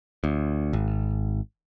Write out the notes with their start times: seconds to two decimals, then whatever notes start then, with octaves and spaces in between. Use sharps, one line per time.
0.24 D2
0.73 G#1